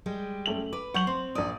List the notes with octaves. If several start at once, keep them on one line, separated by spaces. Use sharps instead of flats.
G3 G#3 G4
F#2 A3 F#7
B4 D6
F#3 F#5 C#6 G6 F#7
C4 C6
A#1 D5 D#6